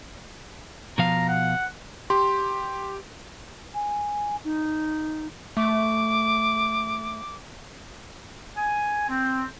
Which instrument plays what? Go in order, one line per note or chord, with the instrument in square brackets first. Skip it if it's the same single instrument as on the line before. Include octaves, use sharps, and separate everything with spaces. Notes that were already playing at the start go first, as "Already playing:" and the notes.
[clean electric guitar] B2 F3 F5 [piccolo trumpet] A#5
[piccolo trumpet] F#5
[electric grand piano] G4 [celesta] C6
[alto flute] G#5
D#4
[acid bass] A3 [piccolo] D6
[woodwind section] G#5
C4